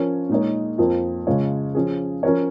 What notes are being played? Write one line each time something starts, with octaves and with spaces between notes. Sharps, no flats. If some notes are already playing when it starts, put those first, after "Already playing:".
Already playing: F3 C#4 A#4 C#5
A#2 G#3 D#4 C#5
F2 F3 A#3 F4
C#3 G#3 F4 C#5
F3 C#4 G#4
F3 C#4 A#4 C#5